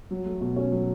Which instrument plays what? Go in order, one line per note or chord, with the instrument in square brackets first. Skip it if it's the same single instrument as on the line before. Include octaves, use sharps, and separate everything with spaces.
[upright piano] F#3
A3
B2
C#4
F#3